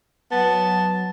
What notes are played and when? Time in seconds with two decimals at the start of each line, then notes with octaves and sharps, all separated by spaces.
0.31 F#3 B3 A5